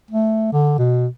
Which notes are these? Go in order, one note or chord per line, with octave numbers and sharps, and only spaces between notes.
A3
D3
B2